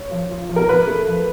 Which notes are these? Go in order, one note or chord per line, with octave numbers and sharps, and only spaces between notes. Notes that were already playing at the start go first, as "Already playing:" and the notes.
Already playing: C#5
F3
F4
F3
A#4
F3 B4
A3
F3